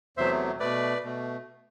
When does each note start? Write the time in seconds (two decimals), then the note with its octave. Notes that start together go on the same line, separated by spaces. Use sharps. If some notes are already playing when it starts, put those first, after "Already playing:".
0.17 E2 C3 F#3 A3 C5 E5
0.60 B2 A3 B4 D5
1.04 B2 A3